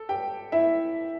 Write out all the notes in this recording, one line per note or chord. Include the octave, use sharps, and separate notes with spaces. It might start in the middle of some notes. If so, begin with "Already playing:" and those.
Already playing: A4
G4 G5
E4 E5